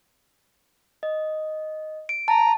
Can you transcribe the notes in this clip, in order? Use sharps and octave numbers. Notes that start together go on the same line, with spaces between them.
D#5
D7
A5 A#5